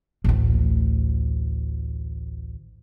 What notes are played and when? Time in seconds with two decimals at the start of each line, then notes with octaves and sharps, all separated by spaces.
0.24 A1 D2